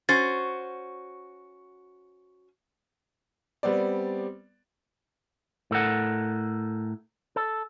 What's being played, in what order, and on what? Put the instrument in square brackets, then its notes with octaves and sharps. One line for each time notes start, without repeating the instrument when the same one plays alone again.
[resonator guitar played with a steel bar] C#4 F#4 C5 [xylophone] A6
[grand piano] G3 B3 C4 D5
[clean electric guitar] A2 A4 A#4 F#5
A4